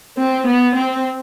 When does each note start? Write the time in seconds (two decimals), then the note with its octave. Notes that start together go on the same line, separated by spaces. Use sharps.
0.18 C4
0.47 B3
0.76 C4